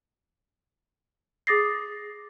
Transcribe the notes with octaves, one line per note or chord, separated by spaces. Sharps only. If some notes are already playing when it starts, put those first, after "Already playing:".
G#4 D6 D#6 A6 A#6 C7